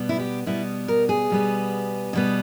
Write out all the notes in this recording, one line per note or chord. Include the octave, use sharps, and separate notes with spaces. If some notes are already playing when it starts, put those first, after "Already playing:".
Already playing: B2 G3 B3
E4
G4
B2 G3 B3 E4
A#4
G#4
B2 G3 B3
B2 G3 B3